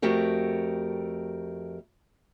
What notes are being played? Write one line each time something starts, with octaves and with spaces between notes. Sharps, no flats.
F2 A3 F#4 G4 A#4